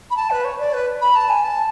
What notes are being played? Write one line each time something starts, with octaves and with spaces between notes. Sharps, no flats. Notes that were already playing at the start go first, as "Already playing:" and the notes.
B5
A5
B4
C#5
D5
B4
B5
A5
G#5
A5